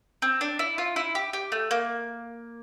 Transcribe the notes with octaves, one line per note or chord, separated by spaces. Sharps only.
C4
D4
E4
F4
E4
G4
G4
A3
A#3